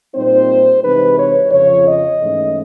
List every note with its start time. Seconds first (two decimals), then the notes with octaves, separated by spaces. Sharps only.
0.15 A#2 G3 C4 D#4 C5
0.83 C3 E3 G#3 C4 D#4 B4
1.18 C#5
1.52 F2 C#3 F3 C#5
1.86 D#5
2.20 G#2 E3 A3 C#4